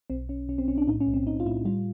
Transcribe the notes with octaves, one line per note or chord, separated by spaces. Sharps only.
B1 C4
B1 C#4
B1 C#4
C4
B1 C#4
D4
A2 D#4
C#4
B1
C4
B1 D#4
F4
A2 E4
G3 F4